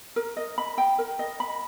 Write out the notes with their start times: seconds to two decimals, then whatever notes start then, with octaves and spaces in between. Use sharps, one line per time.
0.16 A#4
0.37 D#5
0.58 B5
0.78 G5
0.98 A#4
1.19 D#5
1.40 B5